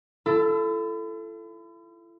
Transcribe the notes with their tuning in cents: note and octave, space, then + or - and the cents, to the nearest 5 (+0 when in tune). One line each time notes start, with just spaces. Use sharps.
E4 +40 A4 +0